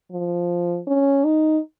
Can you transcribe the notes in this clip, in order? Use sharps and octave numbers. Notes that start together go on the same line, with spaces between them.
F3
C#4
D#4